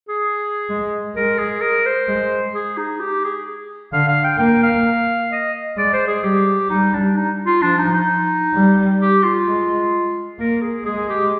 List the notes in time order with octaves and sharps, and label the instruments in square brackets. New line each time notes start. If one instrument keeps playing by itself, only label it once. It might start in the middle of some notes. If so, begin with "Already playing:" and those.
[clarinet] G#4
[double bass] G#3
[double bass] G#3 [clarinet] A#4
[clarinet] G#4
A#4
C5
[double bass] G#3
[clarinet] G#4
D#4
G4
G#4
[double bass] D3 [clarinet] F5
[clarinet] F5
G5
[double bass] A#3 [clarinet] G5
[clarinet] F5
D#5
[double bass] G#3 [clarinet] D5
[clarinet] C5
G#4
[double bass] G3 [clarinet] G4
[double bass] G3 [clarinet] D#4
[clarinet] D4
D#4
F4
[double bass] F3 [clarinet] D4
[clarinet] D#4
D#4
[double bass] G3
[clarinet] G4
F4
[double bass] G#3
[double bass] A#3 [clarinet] A#4
[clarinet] G#4
[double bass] G#3 [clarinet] G#4
[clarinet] G4